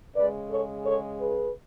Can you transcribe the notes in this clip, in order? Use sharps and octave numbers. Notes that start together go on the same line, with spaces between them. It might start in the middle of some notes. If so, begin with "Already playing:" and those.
C#3 G#3 B4 D5
A4 C#5
A4 C#5
G#4 B4